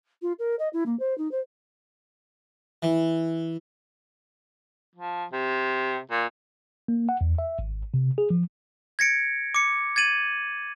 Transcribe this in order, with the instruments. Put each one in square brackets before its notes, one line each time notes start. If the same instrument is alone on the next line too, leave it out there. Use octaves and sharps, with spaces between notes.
[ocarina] F4
A#4
D#5
E4
A#3
C5
D#4
C5
[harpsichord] E3
[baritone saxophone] F3
C3
A#2
[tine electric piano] A#3
F#5
E2
E5
G#1
C3
G#4
F3
[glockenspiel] G#6 A#6 C#7 D7
D6 C#7
G#6 A6 D#7 F#7